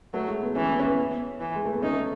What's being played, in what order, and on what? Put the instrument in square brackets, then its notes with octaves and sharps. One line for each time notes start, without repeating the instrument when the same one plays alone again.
[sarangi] F#3 [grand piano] A3
[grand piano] G#3
B3
[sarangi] E3 [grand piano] C#4
[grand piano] B3
C#4
B3
[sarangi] E3
[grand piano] G#3
A3
B3
[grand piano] C#4 [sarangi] D#4
[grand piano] A3